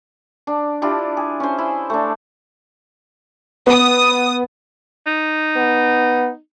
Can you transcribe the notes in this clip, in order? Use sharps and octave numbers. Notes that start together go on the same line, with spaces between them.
D4
D4 E4 F4 G4
G#4
C#4 C5
E4
A3 D4
B3 D#6
D#4
B3